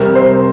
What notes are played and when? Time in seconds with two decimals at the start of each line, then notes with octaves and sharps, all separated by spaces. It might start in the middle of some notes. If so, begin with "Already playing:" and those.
Already playing: C3 G3 C4 A#4
0.15 C5